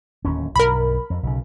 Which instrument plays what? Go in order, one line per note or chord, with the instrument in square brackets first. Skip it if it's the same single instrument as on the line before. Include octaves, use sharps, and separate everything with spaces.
[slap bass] D1 D#2 C#4
[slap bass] B1 G2 [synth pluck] A#4 B5
[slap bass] F2
B1 C#3